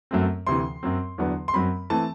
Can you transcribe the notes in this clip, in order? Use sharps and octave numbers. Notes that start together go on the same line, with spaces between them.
F#2 F#3 A3 C4
D2 C3 E3 C6
F#2 F#3 C4
E2 D3 F#3 B3
C6
F#2 F#3 C4 B5
E3 A3 C4 A5